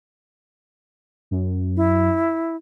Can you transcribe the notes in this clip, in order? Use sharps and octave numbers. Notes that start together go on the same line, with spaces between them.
F#2
E4